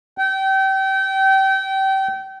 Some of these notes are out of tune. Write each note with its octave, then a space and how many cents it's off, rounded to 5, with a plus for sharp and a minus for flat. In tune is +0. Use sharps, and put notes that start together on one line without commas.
G5 -30